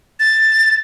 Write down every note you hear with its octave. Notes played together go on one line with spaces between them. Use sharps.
A6